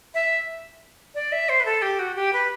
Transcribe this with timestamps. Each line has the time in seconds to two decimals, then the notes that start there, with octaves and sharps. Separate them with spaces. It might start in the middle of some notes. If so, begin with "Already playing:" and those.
0.14 E5
1.15 D5
1.32 E5
1.49 C5
1.60 B4
1.65 A4
1.82 G4
1.99 F#4
2.15 G4
2.33 B4